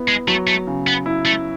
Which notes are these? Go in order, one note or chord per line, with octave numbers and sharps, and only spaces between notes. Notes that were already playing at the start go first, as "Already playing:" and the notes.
Already playing: B3 E4
G#3
F#3 A3
A3
C#3
B3
E4
A3